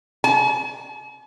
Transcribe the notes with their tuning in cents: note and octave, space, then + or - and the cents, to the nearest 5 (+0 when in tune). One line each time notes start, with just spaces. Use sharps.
G#5 +45